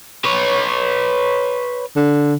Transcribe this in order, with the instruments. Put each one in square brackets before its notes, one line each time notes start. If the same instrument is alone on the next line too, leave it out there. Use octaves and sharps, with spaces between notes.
[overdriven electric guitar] B4 C#5
[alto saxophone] D3